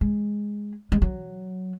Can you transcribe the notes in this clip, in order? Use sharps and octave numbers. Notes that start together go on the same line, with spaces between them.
G#3
G#3
F#3